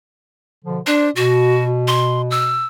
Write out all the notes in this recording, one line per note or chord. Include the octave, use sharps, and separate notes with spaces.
B2 D3 F3
D4 C5 D5
B2 F#4
C6
E6